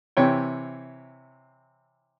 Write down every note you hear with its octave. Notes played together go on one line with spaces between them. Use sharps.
C3 E3 C#5 G5